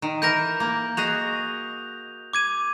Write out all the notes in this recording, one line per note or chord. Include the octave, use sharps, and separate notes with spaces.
D#3
E3 A#4 G6 A#6
A#3
F#4 G#4 D#5 F7
D6 G#6 D#7